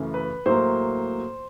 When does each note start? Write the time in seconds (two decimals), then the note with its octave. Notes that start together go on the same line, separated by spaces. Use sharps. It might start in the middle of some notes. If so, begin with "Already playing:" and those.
Already playing: F#2 C#3 E3 A3
0.14 B4
0.46 A2 F#3 A#3 C5